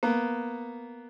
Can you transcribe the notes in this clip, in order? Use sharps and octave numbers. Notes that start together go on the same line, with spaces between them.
A#3 B3